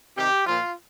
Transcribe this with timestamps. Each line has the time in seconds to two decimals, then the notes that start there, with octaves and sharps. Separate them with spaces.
0.17 C3 D#3 G4
0.46 A#2 F3 F4